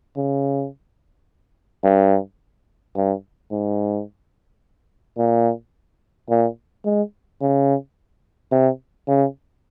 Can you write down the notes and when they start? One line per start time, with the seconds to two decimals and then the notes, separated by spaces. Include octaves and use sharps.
0.17 C#3
1.84 G2
2.96 G2
3.51 G#2
5.18 A#2
6.30 A#2
6.85 G#3
7.41 C#3
8.52 C3
9.08 C#3